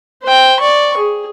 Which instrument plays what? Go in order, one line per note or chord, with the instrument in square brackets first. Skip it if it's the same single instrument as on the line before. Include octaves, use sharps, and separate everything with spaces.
[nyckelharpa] C5 G5
D5 C#6
G#4